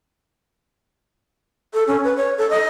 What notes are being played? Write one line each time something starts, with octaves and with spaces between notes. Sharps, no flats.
A4
C#4
B4
C#5
A4
D#5